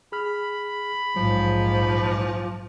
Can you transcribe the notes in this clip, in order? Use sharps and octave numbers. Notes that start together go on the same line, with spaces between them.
G#4 B5 F6
A#1 G#2 F3 F#3